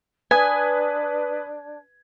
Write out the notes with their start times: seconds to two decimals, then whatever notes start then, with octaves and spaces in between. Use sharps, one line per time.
0.31 D4 B4 G#5 D#6 G#6